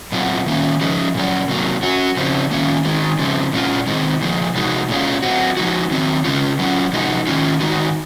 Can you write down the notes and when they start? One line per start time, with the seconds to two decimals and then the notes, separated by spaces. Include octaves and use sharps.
0.12 A#2 F#3 C4 F4
0.46 D#3 A#3 C#4
0.81 F3 G#3 C#4
1.14 A#2 F#3 C#4
1.48 C3 F#3 A#3
1.83 F#3 C#4 F#4
2.17 C#3 F3 C4
2.51 D#3 A#3 C#4 F4
2.85 D#3 G#3 C4
3.19 C#3 F3 G#3 C4
3.53 A#2 G#3 C#4 F4
3.87 C3 D#3 G#3 C4
4.21 A#2 F3 G#3
4.55 C3 F3 G#3 D#4 F#4
4.89 A#2 G#3 C#4 F4
5.23 F#3 C4 F#4
5.57 F3 G#3 D#4 F#4
5.91 D#3 F#3 C4
6.25 C#3 G#3 C#4 F4
6.59 F#3 C#4 F4
6.93 C3 F3 G#3 D#4 F#4
7.27 D#3 G#3 C#4 F4
7.61 D#3 G#3 D#4 F#4